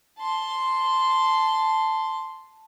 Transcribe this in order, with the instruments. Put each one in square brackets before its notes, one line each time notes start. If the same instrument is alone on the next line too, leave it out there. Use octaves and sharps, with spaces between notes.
[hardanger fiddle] A5 C6